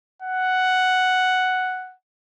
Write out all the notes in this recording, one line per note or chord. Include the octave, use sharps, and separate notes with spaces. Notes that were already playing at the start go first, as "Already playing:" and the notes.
F#5